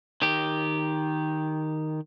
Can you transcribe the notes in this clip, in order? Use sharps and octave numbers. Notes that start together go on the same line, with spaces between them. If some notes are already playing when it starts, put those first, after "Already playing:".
D#3 G4